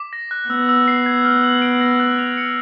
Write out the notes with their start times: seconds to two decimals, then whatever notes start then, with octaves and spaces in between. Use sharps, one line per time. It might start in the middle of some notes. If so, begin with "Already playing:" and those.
Already playing: D6
0.13 A#6
0.31 F#6
0.49 B3 E6
0.69 E6
0.88 C7
1.06 G#6
1.25 F6
1.44 F#7
1.62 D7
1.81 A#6
2.00 F#6
2.18 F7
2.37 C#7